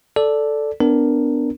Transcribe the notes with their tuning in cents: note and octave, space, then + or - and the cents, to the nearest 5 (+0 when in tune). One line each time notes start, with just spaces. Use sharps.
A4 +0 D5 -5
B3 +20 D4 +0 A#4 +0